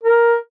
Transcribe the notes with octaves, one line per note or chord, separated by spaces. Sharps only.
A#4